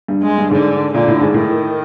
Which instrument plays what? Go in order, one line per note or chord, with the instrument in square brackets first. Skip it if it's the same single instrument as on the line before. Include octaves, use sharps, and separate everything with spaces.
[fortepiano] G2
[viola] G#3
[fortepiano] G2
[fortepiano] G#2 [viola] D3
[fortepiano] A#2 [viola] D3
[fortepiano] A2
G#2
[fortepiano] A2 [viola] D#3